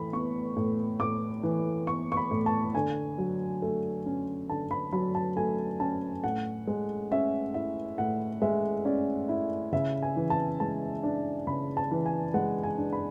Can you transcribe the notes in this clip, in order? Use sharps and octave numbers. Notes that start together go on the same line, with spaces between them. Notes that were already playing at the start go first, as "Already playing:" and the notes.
Already playing: A2 E3 B5
B3 C#6
A2
A2 D6
E3
B3 C#6
C#6
B5
A2
A5
D3 G#5
F#3
A3
C#4
D3 A5
B5
F#3 B5
A5
A3 G#5
C#4 A5
A2 F#5
G#3
C#4 E5
E4 E5
A2 F#5
G#3 E5
C#4 D5
E4
C#3 E5
G#5
E3
A5
G#3 A5
D4
C#3 B5
A5
E3
G#5
G#3 F#5
G#5
D4
B5